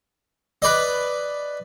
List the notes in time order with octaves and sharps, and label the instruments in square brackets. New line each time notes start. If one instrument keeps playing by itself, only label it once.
[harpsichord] B4 D5 D#5